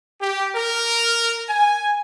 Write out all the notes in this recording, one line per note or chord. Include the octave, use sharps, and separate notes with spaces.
G4
A#4
G#5